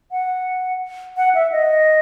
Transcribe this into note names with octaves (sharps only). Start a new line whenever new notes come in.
F#5
F#5
E5
D#5